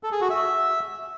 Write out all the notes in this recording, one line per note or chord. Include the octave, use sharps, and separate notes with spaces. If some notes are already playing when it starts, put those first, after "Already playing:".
A4
G#4
F#4
E5